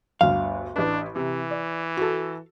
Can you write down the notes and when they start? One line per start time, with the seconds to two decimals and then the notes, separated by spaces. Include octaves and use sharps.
0.21 G1 D2 F5
0.76 A1 D4 B4
1.16 C3 E3
1.51 D5
1.97 F#4 A4